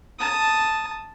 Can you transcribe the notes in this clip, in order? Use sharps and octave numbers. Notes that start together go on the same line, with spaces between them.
A5 D#6